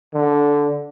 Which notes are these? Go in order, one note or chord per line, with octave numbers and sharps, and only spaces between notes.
D3